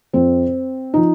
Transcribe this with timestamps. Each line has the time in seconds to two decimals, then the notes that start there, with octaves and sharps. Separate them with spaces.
0.13 F2 F3 C4
0.94 F3 D#4